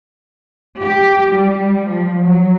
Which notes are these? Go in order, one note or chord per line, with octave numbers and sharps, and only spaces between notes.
G4
G3
F3
F#3